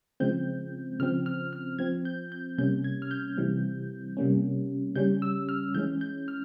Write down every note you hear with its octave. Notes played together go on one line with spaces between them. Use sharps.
C#3 F3 G#3 C4 G6
C#3 F3 C4 F6
F6
F6
F3 C4 G#6
G6
G6
C3 G3 A#3 C#4 G6
G#6
F6
G6
C3 E3 G3 C4
C3 G3 A#3 C#4
C#3 G3 C#4 G6
E6
F6
E3 G#3 C#4 G6
G6
F6